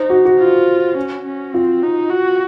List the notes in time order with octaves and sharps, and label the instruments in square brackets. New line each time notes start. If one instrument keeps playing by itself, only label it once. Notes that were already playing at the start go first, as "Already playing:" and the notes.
Already playing: [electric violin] D#4 [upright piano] C5
[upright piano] F#4
F#4
[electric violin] F4
C#4
C#4
[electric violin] C4 [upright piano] F4
[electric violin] D#4
F#4